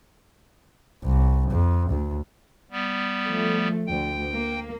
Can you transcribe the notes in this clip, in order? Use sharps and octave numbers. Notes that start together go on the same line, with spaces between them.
C2
F2
D2
G3 B3
F3 A3
D2 G5
A#3